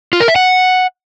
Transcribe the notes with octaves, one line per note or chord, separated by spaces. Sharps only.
F4
A#4
E5
F#5